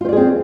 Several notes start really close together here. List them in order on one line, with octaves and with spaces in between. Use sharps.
F4 C5 D5 G#4 C4